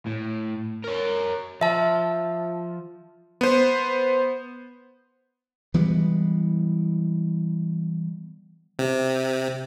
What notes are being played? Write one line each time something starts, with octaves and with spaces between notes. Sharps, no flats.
A2
A#4 C#5
F3 E5 A5
B3 C5
E3 G3 G#3 B3
C3